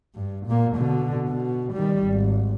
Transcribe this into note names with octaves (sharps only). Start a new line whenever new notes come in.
G2
A#2 A#3
B2 D3
B2
D#3 G3
G#1